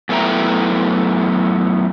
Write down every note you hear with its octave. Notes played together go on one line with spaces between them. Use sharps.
F#2 A3 B3 E4 G5 A#5